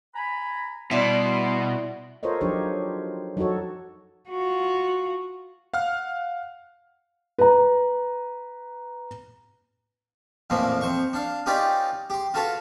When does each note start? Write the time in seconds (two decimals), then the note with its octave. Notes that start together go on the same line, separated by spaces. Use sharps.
0.15 G#5 A#5 B5
0.91 B2 G3 E4 D5 C6
2.23 F4 A4 A#4 C5 C#5 D#5
2.41 F3 F#3 D4 D#4 G4 C#5
3.37 F#3 D#4 F#4 A4 C#5
4.29 F4 F#4
5.74 F5 F#5 F6
7.38 B4 A#5
10.50 A1 F2 A#2 E3 F3 A#3
10.81 F2 C5 C#6
11.13 D4 F5
11.46 C#4 D#4 F4 G4 B4 D5
12.10 G4 C6
12.34 F4 F#4 A4 B4 F5